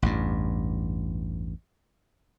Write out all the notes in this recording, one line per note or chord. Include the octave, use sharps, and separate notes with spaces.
A1 E2 G2